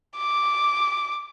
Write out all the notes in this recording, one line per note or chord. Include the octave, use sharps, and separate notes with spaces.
D6